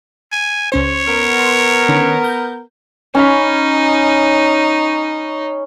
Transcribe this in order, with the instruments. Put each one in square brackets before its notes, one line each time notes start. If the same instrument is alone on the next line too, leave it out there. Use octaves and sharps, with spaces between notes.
[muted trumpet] G#5
[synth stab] C#2 C#4 C5 [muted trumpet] C#5
[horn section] B3 A#4
[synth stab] C6
D3 D#3 C#4
G6
[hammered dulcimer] C#4 B5 [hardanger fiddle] D#4